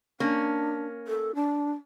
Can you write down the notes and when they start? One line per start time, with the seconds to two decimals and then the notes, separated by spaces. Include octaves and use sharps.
0.20 A#3 C#4 D4
1.08 A4
1.35 D4